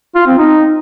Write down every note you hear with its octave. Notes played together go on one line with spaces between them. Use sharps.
F4
C4
D#4